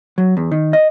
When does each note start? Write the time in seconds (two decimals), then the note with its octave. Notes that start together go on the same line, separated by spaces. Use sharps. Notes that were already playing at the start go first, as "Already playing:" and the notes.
0.18 F#3
0.37 E2
0.52 D#3
0.73 D#5